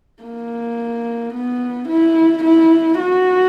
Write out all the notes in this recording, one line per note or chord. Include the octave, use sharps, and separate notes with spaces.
A#3
B3
E4
E4
F#4